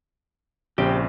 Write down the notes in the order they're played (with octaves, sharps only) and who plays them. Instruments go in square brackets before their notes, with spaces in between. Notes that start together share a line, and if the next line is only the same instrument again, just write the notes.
[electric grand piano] A#1 [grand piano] C#3 C4 D7 [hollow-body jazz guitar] G4